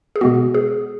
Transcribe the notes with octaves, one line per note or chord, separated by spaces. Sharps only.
G#4
B2 G#3 B3 F#4
G#4